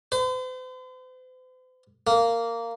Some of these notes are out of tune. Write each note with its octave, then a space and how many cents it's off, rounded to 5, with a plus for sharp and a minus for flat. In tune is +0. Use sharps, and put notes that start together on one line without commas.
C5 -45
A#3 -10